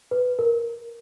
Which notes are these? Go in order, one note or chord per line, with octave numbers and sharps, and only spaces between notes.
B4
A#4